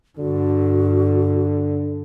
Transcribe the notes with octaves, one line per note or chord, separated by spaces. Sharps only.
G2 D3 F#4